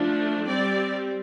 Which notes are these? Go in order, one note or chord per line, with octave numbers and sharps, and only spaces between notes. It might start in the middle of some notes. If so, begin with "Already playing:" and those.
Already playing: F3 A3 D4
G3 C4 D5